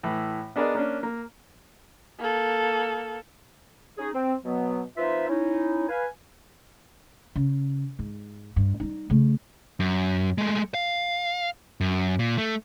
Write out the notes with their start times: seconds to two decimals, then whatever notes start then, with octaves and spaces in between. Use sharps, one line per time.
0.03 A2 E3
0.56 B3 D4 G#4 A#4 D5 D#5
0.75 A#3 C#4 D4
1.03 A#3
2.20 A#3 A4
3.98 C#4 D#4 G#4
4.13 C4
4.44 B2 F#3 B3
4.97 F3 C4 D#4 F4 B4 E5
5.29 C#4 D#4 E4
5.89 B4 F5 G#5
7.36 C#3
7.99 G#2
8.56 G2
8.80 G3 D#4
9.10 C#3 A3
9.80 F#2
10.38 G#3 A3
10.74 F5
11.81 F#2
12.19 A#2
12.38 A3